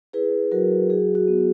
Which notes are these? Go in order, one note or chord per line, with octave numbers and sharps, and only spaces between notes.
E4 G#4 B4
F#3 F#4 A#4
F#4 G#4
F#4
B3